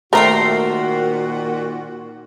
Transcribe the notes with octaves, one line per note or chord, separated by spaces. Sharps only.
A#2 D#3 A3 F#4 A#4 C5 G5